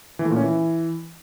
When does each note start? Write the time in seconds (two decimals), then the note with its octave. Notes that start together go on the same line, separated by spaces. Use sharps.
0.19 E3
0.25 A3
0.30 A#2
0.36 C#4
0.42 E3